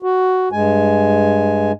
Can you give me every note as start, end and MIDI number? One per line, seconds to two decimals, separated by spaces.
0.03 0.49 66
0.52 1.72 43
0.52 1.72 56
0.52 1.72 80